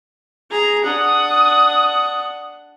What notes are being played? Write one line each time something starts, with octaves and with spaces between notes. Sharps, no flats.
G#4 A#5
D4 F#5 D#6